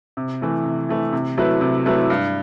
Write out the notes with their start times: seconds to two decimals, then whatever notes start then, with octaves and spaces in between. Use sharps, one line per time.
0.17 C3
0.41 E3 A3 E4
0.65 C3
0.89 E3 A3 E4
1.13 C3
1.37 F#3 A3 E4 B4
1.61 C3
1.86 F#3 A3 E4 B4
2.10 G2